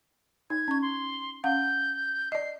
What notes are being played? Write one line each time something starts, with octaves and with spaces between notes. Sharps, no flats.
D#4 G#6
C#4 C#6
C6
C#4 F5 F#5 G6
D5 D#5 C7